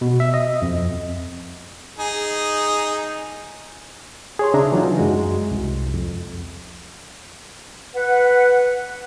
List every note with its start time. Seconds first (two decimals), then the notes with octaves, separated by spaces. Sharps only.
0.01 B2
0.20 E5
0.34 D#5
0.62 F2
1.98 D#4 G#4
4.39 G#4 C#5 C6
4.54 C#3 D4 E5 A#5
4.72 E3 F#3 D#4 F4
4.98 F#2 G#3 F#4
5.51 C2
5.94 F2
7.95 B4 F#5